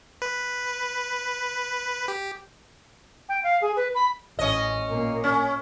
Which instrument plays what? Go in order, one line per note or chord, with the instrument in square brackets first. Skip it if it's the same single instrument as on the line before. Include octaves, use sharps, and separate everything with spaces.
[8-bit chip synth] B4
G4
[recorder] G5
F5
G#4
B4
B5
[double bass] A1 [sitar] C#4 D#5
[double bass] A#2 A#3
[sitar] C#4